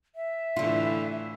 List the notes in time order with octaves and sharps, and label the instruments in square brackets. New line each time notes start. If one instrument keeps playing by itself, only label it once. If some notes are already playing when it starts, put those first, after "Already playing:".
[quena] E5
[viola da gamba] A2 E3 [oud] D3 F4